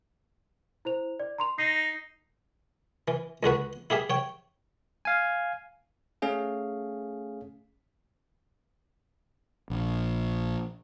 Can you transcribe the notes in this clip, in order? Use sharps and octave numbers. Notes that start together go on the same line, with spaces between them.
E4 C5 F7
D5
A#5 C6 F7
D#4 A#6 C7
E3
C#2 D3 F#4 B4
E4 G4 G#4 E5
C#5 G5
F5 G#5
A3 C#4 G#4 F5
A#1